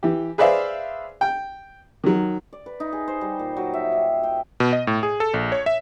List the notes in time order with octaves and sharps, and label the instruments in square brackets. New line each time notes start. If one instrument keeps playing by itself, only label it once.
[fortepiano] E3 G4
G#4 B4 C5 D5 E5 F5
G5
D#3 F#3
[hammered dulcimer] D5
B4
D#4
G#4
C5
G3
A#2
F#3
E5
G4
G5
[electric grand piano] B2
D#5
A2
G#4
A4
A#1
C#5
E5